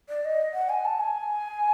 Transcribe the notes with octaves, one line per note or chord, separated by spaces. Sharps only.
D5
D#5
F#5
G#5
A5
G#5